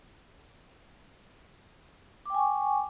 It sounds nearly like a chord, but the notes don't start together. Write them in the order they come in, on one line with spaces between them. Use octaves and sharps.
D6 G5 G#5 C#6